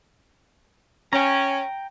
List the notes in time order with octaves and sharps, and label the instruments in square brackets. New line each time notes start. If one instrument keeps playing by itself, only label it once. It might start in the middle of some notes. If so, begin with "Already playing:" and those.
[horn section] C#4 [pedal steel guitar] G5 A#5